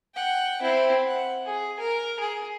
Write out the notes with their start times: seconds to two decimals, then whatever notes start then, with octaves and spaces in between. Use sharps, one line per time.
0.15 F#5 G5
0.61 C4 E4
1.07 F#5
1.46 G#4
1.79 A#4
2.19 G#4